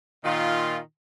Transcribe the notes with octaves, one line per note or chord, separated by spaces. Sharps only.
A#2 D#3 F4